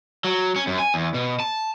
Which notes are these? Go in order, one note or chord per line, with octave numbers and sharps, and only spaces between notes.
F#3
C#4
F#2
G#5
E2
B2
A5